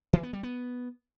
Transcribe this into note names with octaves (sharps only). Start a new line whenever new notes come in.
E3
B3
G3
B3